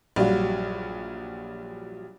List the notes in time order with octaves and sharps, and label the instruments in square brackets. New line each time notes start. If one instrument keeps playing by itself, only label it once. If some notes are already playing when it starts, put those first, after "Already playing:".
[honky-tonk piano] A#1 G2 F#3 F5